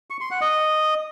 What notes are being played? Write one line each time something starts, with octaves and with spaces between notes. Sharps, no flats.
C#6
C6
F#5
D#5